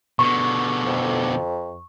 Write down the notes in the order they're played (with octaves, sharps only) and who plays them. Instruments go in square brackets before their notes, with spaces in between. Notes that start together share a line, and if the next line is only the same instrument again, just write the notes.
[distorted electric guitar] B2 D3 [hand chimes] C#6
[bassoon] F2